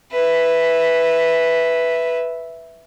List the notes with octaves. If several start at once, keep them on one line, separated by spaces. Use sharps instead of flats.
B4 E5